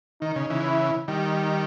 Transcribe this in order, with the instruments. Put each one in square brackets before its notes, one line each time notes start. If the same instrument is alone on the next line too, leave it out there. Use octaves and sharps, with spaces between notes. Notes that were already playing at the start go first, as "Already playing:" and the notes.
[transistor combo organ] D#3 [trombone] D#4
[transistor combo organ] C#3
C#3 E3
[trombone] E4
[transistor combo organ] D#3 G3 [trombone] D#4